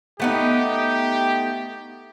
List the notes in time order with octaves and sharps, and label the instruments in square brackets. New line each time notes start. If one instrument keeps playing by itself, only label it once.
[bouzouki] A3 B3 D#4 [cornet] G4